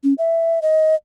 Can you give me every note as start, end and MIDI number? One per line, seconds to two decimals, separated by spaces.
0.04 0.14 61
0.18 0.59 76
0.62 0.95 75